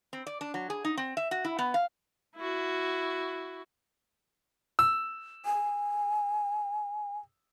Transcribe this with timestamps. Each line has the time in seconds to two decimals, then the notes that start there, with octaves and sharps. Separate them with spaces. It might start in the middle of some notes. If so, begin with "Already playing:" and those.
0.13 C4
0.27 D5
0.41 D4
0.54 F#3
0.70 G#4
0.84 D#4
0.97 C4
1.17 E5
1.31 F#4
1.45 E4
1.59 B3
1.74 F5
2.36 E4 F#4
4.79 E6
5.46 G#5